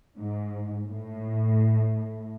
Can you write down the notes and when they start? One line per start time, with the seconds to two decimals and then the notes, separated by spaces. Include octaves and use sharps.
0.19 G#2
0.87 A2